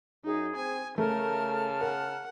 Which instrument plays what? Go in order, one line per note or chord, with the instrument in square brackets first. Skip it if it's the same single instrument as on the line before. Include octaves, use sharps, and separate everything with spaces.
[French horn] F#2 [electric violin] D#4 [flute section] G#4
[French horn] C4 [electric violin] G#5
[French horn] C#3 [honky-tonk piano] A3 [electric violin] A#4 [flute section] A5 F6
[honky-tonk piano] A#4 [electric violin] F#5